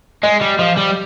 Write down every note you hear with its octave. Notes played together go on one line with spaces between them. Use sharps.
G#3 D#5
G3
F3 D#5
G3